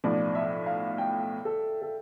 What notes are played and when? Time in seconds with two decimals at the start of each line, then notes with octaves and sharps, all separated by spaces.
0.04 B1 A2 F3 D5
0.35 E5
0.66 F5
0.98 G5
1.45 A4
1.82 A4